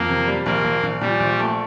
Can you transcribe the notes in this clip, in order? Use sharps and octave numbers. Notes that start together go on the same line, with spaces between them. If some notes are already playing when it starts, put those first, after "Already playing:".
Already playing: F2 A#3
C3
G3
A#1 A#3
A#1
A#1
A#2 G3
A#1
A3